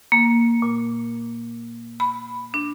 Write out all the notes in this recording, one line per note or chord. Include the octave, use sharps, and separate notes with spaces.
A#3
A#2
B5
D4